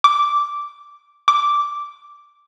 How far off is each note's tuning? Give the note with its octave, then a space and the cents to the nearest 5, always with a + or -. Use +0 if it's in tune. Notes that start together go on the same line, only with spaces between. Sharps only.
D6 -5
D6 -5